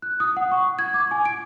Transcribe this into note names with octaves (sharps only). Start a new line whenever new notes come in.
F#6
D#6
F#5
C#6
G#6
D6
G#5
D7